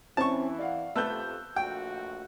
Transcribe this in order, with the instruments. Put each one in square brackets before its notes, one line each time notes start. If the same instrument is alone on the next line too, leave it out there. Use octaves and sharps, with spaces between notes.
[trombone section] E3 E4 [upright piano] C4 C#4 [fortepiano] A5 C#6
[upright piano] D5 F5 F#5
[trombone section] F2 C3 [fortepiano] A3 B3 [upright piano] E6 F#6 G6
[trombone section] A#1 A3 F#4 [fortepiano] G5